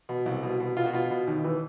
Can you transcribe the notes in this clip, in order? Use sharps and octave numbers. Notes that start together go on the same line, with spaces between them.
B2
C2
B2
B2
B2 F4
F#4
B2 F4
B2
D#2
E3